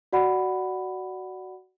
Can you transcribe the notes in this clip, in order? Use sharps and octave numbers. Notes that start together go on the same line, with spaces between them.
F#4 D5 F#5 B5